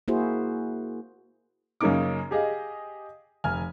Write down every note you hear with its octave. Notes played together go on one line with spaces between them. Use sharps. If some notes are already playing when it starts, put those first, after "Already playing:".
A#3 E4 F#4 G#4 C5
F#2 C#3 A#3 C#4 D#4 D6
G4 G#4 D#5 F5
F1 G#5 F6